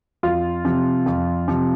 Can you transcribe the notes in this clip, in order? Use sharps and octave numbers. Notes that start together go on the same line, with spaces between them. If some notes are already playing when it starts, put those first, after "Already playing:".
F2 F4
C3 F3
F2
C3 F3